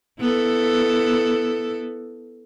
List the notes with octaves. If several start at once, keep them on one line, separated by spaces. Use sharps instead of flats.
B3 E4 A4